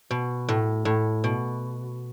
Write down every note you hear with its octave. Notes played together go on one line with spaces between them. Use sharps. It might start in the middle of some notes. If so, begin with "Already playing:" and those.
B2
A2
A2
B2